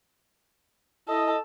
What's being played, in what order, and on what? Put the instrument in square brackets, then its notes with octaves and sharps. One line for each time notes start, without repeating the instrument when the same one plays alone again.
[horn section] E4 D#5 [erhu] A4